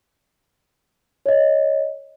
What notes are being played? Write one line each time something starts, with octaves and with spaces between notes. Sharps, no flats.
C#5 D#5